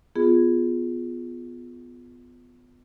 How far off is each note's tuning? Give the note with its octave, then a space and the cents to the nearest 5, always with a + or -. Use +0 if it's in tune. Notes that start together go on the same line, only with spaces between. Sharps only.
B3 +15 F4 +0 G#4 +0